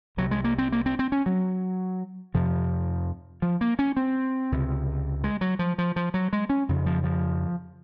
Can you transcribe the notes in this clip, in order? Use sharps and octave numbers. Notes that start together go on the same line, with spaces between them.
C2 C3 F#3
G#3
A#3
C4
A#3
C4
C4
C#4
F#3
F2 C3 F3
F3
A#3
C#4
C4
C#2 C3
G#3
F#3
F3
F3
F3
F#3
G#3
C#4
F2 C#3
F3
F3